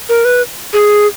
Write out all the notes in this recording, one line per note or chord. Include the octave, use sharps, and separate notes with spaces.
A#4
B4
G#4